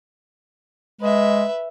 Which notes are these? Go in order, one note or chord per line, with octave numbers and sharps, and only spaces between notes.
G#3 B4 E5